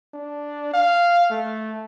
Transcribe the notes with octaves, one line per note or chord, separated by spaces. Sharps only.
D4
F5
A3